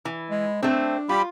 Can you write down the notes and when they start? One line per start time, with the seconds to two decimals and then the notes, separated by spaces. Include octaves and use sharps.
0.05 E3
0.30 G#3
0.63 A3 C4 D4
1.09 G3 F4 G4 B5